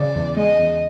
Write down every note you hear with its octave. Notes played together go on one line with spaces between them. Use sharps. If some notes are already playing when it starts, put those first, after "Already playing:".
Already playing: C#3 D5
E2
G#3 D#5
E2